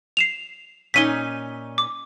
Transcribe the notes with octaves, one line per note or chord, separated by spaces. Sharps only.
C7 E7 F7
A#2 C#4 D#4 B6 D#7 G7
D6